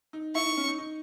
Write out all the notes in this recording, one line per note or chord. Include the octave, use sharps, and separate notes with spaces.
D#4
E4 C#6
D#4
C#4
D#4
D#4